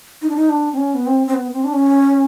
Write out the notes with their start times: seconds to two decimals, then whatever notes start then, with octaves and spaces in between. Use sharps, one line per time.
0.22 D#4
0.29 D4
0.36 D#4
0.49 D4
0.73 C4
0.78 C#4
0.95 B3
1.07 C4
1.27 C4
1.34 B3
1.53 C4
1.64 D4
1.73 C#4